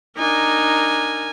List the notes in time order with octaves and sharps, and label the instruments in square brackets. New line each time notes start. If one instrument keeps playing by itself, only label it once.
[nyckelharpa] D4 D#4 [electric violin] A#4 G#5